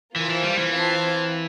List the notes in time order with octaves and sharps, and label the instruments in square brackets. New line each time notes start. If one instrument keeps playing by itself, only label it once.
[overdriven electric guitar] E3 [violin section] A#3 F4 C5 F5 A5
[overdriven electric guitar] E3
G3
E3
[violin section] C4 F4 C5 F5 A5